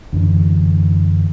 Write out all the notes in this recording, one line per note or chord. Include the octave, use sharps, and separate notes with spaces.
F#2 D3 E3 D4